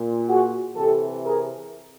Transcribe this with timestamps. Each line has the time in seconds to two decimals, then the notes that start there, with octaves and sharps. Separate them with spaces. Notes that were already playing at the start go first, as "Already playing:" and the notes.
Already playing: A#2
0.27 F#4 G#4
0.76 C3 E3 G4 A4
1.24 G#4 A#4